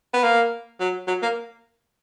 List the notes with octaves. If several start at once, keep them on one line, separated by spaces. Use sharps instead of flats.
B3
A#3
F#3
F#3
A#3